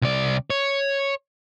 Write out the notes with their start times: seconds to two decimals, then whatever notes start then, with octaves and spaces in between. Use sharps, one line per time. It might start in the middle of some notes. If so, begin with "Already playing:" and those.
0.02 C2 D5
0.50 C#5